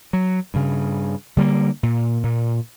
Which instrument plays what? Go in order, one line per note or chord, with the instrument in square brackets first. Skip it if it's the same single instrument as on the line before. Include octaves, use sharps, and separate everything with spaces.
[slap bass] F#3
G2 C#3
D3 G3 G#3 A#3
A#2
A#2